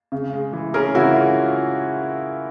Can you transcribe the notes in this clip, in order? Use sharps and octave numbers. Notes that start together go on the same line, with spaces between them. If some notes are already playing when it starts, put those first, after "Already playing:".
C#3
G#3
E3
C#4 G#4 A#4
C#3 E4 F#4
G#3 F4